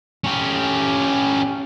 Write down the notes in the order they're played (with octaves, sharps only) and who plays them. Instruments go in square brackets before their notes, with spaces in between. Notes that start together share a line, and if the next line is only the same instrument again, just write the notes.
[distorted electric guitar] C#4 G4